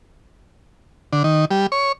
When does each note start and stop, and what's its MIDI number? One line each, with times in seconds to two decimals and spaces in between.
1.13 1.23 50
1.24 1.45 51
1.51 1.67 55
1.72 1.92 73